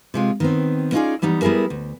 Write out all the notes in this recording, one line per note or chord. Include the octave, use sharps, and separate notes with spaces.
C3 G#3 F4
D#3 B3 C4
B3 C#4 D#4 F4 G#4 D5
E3 G3 B3 D#4
G3 B3 E4 G#4 A#4
D2